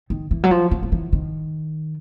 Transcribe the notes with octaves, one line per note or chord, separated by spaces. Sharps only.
D#3
E3
F#3
F3
F3
F3
E3
D#3